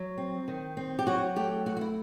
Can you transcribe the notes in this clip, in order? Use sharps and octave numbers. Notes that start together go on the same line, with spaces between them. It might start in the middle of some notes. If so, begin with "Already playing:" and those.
Already playing: F#3
C4
D#3
C4
G4
F#3 F#4
A3 G4
A3 F#4
F#4
E4